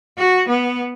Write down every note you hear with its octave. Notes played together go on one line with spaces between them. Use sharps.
F#4
B3